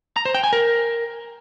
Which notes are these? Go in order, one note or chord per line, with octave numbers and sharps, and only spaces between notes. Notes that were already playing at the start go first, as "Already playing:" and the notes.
A#5
C5
G5
G#5
A#4